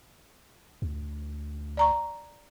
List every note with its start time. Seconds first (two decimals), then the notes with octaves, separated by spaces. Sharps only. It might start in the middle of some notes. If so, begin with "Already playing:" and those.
0.82 D2
1.77 D5 A#5 C#6